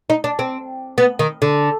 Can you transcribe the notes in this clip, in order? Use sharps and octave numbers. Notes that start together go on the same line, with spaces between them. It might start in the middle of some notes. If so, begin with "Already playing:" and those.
D#4
D4
C4
B3
D#3
D3